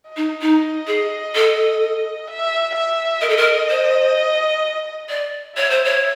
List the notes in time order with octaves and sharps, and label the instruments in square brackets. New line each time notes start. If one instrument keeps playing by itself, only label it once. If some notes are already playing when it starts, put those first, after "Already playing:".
[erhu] D#5
[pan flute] D#4
D#4
G#4
A4
[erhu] E5
E5
[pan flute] A#4 [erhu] D#5
[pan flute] A4
A#4
C5
D5
[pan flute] C#5 [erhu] E5
[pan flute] C5
C#5